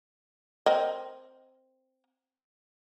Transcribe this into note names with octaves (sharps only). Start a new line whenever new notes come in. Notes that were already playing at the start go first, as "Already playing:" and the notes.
C4 A#4 D#5